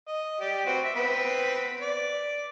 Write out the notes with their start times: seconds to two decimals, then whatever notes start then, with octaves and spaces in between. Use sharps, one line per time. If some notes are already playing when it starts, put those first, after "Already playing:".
0.08 D#5
0.41 G4 D5
0.67 C4 F#4 B4
0.83 E5
0.96 B3 C4 B4
1.81 D5